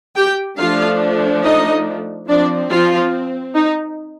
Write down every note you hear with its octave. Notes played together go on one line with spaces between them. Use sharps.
G4 G5
F3 A3 D4 F4 F5
D#4 D#5
F3 C4 D4 D5
F3 F4
D#4